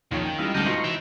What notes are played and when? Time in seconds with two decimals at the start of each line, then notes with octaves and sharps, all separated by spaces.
0.11 A#1 D#2 D#3 F3 C#5
0.25 G5
0.38 F3 G3 G#3 D#4 E4 F5
0.54 D2 G#2 G3 G4 A4 D#5 A#5 F6
0.66 B2 F3 D#4 A#5 C6 C#6
0.84 E3 E5 G5